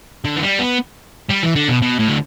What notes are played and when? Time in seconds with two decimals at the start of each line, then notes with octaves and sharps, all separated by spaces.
0.24 D3
0.35 E3
0.42 G3
0.59 B3
1.29 G3
1.43 E3
1.55 D3
1.69 B2
1.82 B2
2.00 A2
2.09 D3